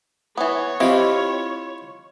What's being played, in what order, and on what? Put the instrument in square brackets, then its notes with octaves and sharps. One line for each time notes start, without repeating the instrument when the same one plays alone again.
[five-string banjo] E3 B3 [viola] C#5
[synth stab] C4 E4 G4 [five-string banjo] F4 [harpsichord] D#5 B5